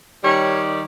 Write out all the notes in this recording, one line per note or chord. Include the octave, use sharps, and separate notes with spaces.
D#3 G3 C#5